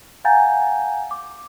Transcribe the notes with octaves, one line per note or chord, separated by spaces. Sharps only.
F5 F#5 G#5 A#5 G6 A6
D6